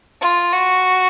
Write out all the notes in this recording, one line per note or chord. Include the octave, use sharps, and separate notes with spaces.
F4
F#4